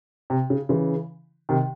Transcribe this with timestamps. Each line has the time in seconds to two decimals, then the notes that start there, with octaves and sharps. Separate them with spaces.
0.30 C3
0.50 C#3
0.69 C#3 E3
1.49 C3 D#3